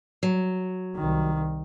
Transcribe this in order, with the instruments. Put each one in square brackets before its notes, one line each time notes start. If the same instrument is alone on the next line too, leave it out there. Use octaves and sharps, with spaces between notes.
[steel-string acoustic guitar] F#3
[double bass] C2 D#3